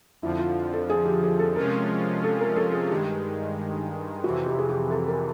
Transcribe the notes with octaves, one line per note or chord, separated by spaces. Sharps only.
F2 D3 F3 E4
F4
A4
G#4
G4
G#4
A4
C3 F3 G#3 C#4 F4 A#4
A4
A#4
A4
G#4
G2 D#3 G#3 G4
F2 C3 E3 F#4
G4
G#4
G4
A4
A#4